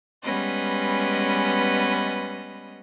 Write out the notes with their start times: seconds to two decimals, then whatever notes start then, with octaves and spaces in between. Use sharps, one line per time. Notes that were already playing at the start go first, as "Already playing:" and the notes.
0.24 G3 G#3 B3 C#4 B4 D#5